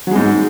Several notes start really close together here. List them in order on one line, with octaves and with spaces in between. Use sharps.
F#3 G#3 G#2